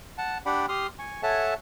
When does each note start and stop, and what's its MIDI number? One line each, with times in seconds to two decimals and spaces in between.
0.18 0.38 78
0.18 0.38 81
0.46 0.66 62
0.46 0.66 67
0.46 0.66 74
0.46 0.66 78
0.46 0.66 79
0.46 0.66 83
0.69 0.87 67
0.69 0.87 84
0.69 0.87 87
0.69 0.87 89
0.99 1.23 80
0.99 1.23 85
1.23 1.54 69
1.23 1.54 73
1.23 1.54 76
1.23 1.54 78
1.23 1.54 80
1.23 1.54 81